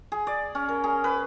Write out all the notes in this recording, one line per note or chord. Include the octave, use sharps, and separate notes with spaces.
G#4
D5
C#4
A#4
G#4
B4